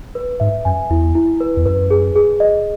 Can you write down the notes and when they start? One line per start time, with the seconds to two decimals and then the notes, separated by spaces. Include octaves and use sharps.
0.15 B4
0.40 G#2 E5
0.65 F#2 G#5
0.90 E2 E4
1.15 E4
1.40 B4
1.57 E2
1.66 F#2 B4
1.90 G#4
2.16 G#4
2.40 D#5